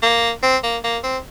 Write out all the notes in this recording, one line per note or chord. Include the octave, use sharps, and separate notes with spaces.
A#3
C4
A#3
A#3
C4